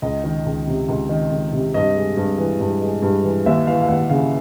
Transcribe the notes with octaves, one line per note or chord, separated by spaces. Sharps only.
C#2 D#5
D#3
C#2
C3
C#2
D#3
C#2
C3
G2 D#5
G#3
G2
E3
G2
G#3
G2
E3
D#2 E5
E3 F5
F5
D#2 F#5
C#3 F5